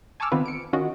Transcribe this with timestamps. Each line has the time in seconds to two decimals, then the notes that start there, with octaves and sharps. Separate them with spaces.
0.20 G#5 A5 C#6 D6 E6 F6
0.32 D#3 B3 C4 F4 B4
0.46 C#7 D7
0.73 D#3 C#4 F4 F#4 D#5